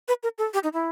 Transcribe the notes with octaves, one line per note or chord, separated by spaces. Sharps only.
B4
A#4
A4
G4
D#4
E4